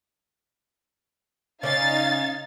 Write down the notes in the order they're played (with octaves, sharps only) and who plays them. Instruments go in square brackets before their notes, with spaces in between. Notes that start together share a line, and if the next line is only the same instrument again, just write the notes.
[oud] C#3 C#4 D5 [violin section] D#4 F5 A6